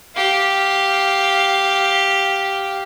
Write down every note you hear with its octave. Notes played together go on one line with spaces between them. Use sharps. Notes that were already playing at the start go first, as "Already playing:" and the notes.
G4 F5